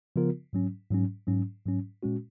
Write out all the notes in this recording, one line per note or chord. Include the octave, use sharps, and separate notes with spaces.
C#3 F3 B3 F4 A#4
G#2 F#3 C#4
G#2 F#3 C#4
G#2 F#3 C#4
G#2 F#3 C#4
A#2 G#3 C#4 F#4